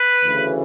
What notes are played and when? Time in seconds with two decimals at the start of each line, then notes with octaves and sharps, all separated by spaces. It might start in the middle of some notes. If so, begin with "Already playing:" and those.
Already playing: B4
0.24 D2 C#3 E3